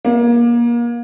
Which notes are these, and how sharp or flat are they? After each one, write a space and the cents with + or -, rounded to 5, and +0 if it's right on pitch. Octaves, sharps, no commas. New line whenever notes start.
A#3 +30